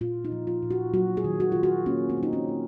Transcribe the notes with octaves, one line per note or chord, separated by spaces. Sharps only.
A#2 F4
D#4
F3
F4
A#2
F#4
F#3 F#4
G#4
D#3
F#4
D#3 F4
F#4
A#3 C#4
C4
D#3
D#4
C#4
A#3